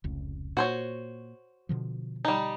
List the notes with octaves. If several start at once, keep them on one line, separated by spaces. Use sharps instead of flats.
F1 C#2
A#2 F#4 C5 C#5
B2 D3 F3
G3 D#4